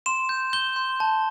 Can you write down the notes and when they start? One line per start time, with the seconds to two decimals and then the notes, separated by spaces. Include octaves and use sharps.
0.06 C6 E7
0.29 G6
0.53 G6 G7
0.76 C6
1.00 A5